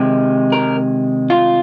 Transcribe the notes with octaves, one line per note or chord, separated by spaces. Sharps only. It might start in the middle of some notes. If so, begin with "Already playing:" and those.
Already playing: C3 D#3 G#3
A#4
F4